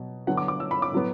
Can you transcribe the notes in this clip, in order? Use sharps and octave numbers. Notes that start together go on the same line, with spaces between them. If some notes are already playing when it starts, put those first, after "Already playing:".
Already playing: B2 F#3
D3 F#3 B3 F#5
D6
D6
E6
B5
D6
A2 F#3 B3